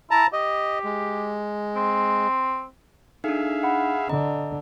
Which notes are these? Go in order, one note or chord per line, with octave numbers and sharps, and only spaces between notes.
E4 A5 A#5
G4 D#5
G#3
C4
D4 D#4 G#4 A4 E5 F5
F#5 B5
D3 D#5 A#5